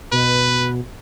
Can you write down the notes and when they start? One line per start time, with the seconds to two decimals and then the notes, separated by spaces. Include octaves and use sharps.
0.12 B2 B4